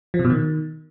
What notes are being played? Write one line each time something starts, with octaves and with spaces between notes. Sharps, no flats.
F3
C3
B2
D#3